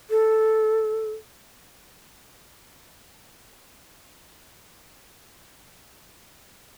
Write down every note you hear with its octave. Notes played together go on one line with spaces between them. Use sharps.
A4